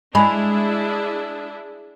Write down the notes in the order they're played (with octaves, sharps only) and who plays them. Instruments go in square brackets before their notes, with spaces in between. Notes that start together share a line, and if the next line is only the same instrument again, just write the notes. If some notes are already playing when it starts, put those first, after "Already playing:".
[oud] G#3 [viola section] D4 E4 G#4 [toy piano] B5